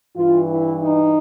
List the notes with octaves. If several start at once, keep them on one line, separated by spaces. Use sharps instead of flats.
G2 E3 F4
E4
D#4